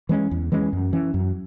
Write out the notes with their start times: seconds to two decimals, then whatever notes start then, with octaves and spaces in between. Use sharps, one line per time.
0.09 E3 G#3 C#4
0.31 E2
0.52 E3 G#3 C#4
0.73 F#2
0.93 E3 C#4
1.14 F#2